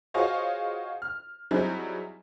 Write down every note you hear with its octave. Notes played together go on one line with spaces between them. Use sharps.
F4 F#4 G#4 C5 C#5 D#5
F6
F#3 G3 C4 D#4 E4 G#4